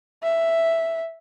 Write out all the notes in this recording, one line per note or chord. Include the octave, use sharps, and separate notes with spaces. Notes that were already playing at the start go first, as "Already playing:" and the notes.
E5